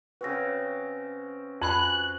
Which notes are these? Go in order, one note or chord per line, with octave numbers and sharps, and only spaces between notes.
C#3 C4 F#4 B4 A#6
F2 F#4 G#5 B5 F#6